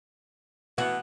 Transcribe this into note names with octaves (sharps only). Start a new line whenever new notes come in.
B2 E3 B3 F#4